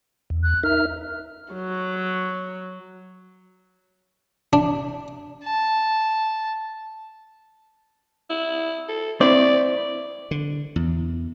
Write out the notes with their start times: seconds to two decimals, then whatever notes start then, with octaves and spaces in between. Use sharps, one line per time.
0.30 E2
0.43 F#6
0.63 D#4 A#4 E5 F6
1.53 F#3
4.53 D4
5.44 A5
8.30 E4
8.88 A4
9.21 C4 E4 D5
10.31 D3
10.76 E2